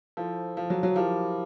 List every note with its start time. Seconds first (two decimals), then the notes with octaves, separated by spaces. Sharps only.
0.17 F3 E4 A4 C5
0.57 F3
0.70 F#3
0.83 F#3
0.96 F3 E4 G4 A#4